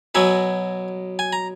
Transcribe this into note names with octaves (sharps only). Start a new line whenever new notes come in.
B2 F#3 E5 G#5
G#5
A#5